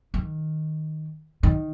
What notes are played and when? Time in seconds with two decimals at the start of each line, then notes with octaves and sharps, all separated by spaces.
0.14 D#3
1.43 D#3